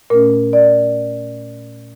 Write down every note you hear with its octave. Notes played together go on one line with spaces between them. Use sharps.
A#2 A3 C#4 A#4
D5